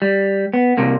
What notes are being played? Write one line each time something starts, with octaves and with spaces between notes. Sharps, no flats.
G3
B3
C2 C3 A#3